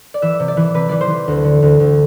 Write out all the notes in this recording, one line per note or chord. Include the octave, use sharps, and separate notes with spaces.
D5
E3 E5
C3
D5
E3
C3 B4
E3 D5
C5
E3
D2
D3
D2
D2